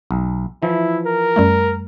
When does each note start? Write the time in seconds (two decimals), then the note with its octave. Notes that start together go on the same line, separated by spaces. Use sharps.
0.11 B1
0.63 E3 F3 E4
1.06 A#4
1.36 F#2 G3 A3